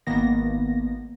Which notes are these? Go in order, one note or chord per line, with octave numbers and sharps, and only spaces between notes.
G#1 D#3 A#3 B3 A#6